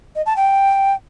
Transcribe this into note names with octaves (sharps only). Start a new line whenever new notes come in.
D#5
A5
G5